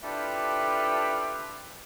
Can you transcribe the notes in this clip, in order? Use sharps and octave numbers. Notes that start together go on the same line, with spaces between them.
D4 E4 F4 G4 A4 B4